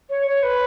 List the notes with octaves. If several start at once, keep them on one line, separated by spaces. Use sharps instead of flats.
C#5
C#5
B4